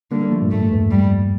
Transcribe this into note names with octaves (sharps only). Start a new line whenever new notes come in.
D3 G3 A#3
G3 A#3
F3 A3
G2 A#2
F2 A2 A3
E2 G2
G3